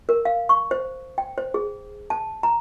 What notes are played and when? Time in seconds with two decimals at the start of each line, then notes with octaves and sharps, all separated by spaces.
0.09 A#4
0.25 F5
0.49 C#6
0.71 C5
1.18 G5
1.38 C5
1.54 G#4
2.10 A5
2.43 A#5